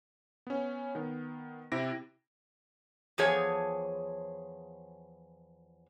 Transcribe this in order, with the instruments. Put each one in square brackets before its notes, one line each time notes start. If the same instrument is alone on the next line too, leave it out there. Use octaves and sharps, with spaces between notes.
[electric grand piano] B3 C#4
D#3 B3
C3 E4 G4 A#6 D7
[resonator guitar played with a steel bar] E2 F3 G#4 C#5